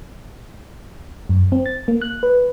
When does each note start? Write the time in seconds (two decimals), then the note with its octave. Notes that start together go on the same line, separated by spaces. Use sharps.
1.29 F#2
1.52 C4
1.66 A6
1.88 A#3
2.01 F#6
2.23 B4